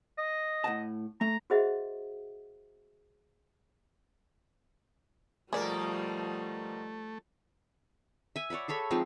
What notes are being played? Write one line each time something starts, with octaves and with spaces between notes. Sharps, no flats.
D#5
A2 F#5 A5
A3 A#5
F#4 G#4 C5 D#5 E5 F#5
B2 F3 G3 A3 A#3 G#4 A#4 D5
E5 G#5
C#5 D5 F#5 B5
G#4 A4 C#5 B5
F3 G#3 C4 D#4